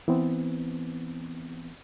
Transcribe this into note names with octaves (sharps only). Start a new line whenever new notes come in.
E3 B3 C4